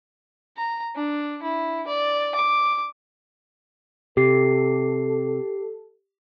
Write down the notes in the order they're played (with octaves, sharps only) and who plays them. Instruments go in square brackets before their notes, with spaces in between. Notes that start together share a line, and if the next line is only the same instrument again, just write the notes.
[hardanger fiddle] A#5
D4
E4
D5
D6
[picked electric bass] C3 [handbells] G4 C7 [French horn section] A4